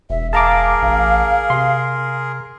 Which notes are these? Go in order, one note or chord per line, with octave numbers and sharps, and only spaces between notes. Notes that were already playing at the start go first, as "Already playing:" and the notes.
E1 E5
G#4 A#4 F5 A5 A#5 D6
A1
C3 C6